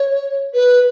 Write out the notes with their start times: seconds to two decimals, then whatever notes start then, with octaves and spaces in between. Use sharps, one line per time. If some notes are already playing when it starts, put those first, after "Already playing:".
Already playing: C#5
0.54 B4